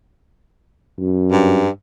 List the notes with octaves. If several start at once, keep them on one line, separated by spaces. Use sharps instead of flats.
F#2
G2